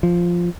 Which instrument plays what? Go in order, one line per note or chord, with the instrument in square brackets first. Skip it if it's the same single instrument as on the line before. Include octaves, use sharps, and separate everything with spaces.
[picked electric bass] F3